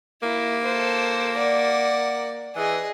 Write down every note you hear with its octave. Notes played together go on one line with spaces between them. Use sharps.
A#3 E4
A4 C5
D5 F#5
E3 G#4 D#5